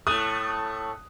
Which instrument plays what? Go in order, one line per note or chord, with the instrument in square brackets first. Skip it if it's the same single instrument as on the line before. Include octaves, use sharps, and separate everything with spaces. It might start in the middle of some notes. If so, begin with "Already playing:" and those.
[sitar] A2 A3 [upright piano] D#6 F#6 D#7